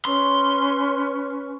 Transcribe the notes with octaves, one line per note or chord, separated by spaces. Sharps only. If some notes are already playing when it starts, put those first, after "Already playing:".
C#4 B4 C6 C#6